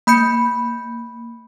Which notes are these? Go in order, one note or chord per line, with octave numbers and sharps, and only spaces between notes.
A#3 B5 G6 C#7